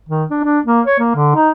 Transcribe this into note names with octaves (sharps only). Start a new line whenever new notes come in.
D#3
D4
D4
A#3
C#5
A#3
D3
D#4